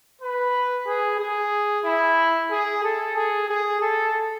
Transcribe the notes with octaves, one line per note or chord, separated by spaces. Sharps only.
B4
G#4
G#4
E4
G#4
A4
G#4
G#4
A4